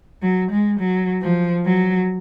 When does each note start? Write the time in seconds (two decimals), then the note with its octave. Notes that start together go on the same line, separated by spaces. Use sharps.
0.22 F#3
0.51 G#3
0.79 F#3
1.22 F3
1.65 F#3